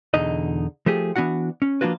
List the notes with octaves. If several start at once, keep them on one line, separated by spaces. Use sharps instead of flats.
E2 B2 D3 D#4 D#5
F3 A3 G4 G#4
E3 B3 D4 F#4 F#5
C#4
F3 A#3 D4 F4 F#4 B4